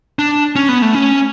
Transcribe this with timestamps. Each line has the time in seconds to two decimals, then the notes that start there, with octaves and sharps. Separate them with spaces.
0.19 D4
0.56 C#4
0.69 B3
0.82 A3
0.95 C#4